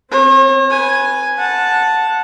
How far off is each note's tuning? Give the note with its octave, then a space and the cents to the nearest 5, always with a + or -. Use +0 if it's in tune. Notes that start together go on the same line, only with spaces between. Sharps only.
C4 +0 C#5 -45
B4 +0 G#5 +0
F#5 -15 A5 +0